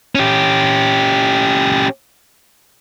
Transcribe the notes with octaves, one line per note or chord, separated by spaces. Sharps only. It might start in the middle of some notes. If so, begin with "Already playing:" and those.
C#4 G4